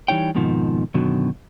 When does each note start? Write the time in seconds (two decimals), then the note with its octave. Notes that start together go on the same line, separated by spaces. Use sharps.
0.08 E3 G3 D#4 C#5 G5
0.35 F2 G#2 B2 D#3 F3
0.94 F#2 B2 D3 D#3 F#3